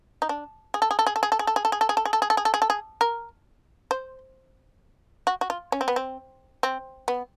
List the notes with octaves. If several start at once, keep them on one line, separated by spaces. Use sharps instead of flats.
D#4
D4
G#4
A4
G#4
A4
G#4
A4
G#4
A4
G#4
A4
G#4
A4
G#4
A4
G#4
A4
G#4
A4
G#4
A4
G#4
A4
G#4
A4
G#4
A#4
C5
F#4
F#4
F4
C#4
C4
B3
C4
C4
B3